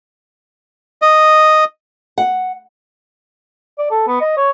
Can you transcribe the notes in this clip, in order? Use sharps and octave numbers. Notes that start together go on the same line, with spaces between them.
D#5
F#5
D5
A4
B3
D#5
C#5